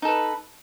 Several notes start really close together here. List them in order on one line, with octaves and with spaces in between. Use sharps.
D#4 A4 B4